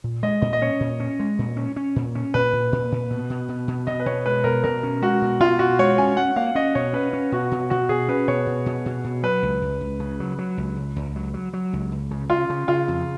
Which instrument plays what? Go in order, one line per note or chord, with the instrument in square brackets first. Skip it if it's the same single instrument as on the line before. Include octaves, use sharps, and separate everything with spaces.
[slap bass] A#2
[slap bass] G#3 [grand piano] D#5
[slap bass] A#2 [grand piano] D#5
[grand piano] D#5
[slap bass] C#4 [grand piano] C#5
[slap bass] A#2
C#4
G#3
A#2
C#4
C#4
A#2
C#4
[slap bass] A#2 [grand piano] B4
[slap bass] A#2
A#2
A#2
B2
B2
B2
B2
[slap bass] B2 [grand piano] D#5
[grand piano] B4
[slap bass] B2 [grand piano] C#5
[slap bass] G#3 [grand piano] B4
[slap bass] B2 [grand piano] A#4
[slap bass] B2 [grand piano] A#4
[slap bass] C#4
[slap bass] G#3 [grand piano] F#4
[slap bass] B2
[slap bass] B2 [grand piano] F4
[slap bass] B2 [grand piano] F#4
[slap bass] G#3 [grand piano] C#5
[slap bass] C#4 [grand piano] G#5
[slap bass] C#4 [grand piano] F#5
[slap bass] A#3 [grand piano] F5
[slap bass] C#4 [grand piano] D#5
[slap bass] B2 [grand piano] C#5
[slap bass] C#4 [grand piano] B4
[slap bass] C#4
[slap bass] B2 [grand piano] F#4
[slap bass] B2
[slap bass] B2 [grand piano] F#4
[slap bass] B2 [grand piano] G#4
[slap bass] C#4 [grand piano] B4
[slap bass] B2 [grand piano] C#5
[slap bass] B2
B2
B2
B2
[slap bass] F#3 [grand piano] B4
[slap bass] C#2
C#2
C#2
C#3
F#3
F#3
C#2
C#2
C#2
F#3
F#3
F#3
C#2
C#2
C#3
[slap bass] C#3 [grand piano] F4
[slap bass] C#3
[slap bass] C#3 [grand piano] F4
[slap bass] F2